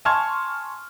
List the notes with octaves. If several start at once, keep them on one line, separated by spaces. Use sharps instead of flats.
G#5 A5 C6 C#6 F6 G#6